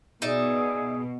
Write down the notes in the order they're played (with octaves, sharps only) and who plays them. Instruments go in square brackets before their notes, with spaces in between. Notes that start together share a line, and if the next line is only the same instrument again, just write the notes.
[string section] B2 [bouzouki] D#4 D5 E5 [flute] G#4